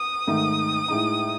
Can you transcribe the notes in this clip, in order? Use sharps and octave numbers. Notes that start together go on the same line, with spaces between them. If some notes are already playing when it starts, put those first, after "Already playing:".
Already playing: D#6
G#2 D#3 A3 D#4
A2 G#3 D#4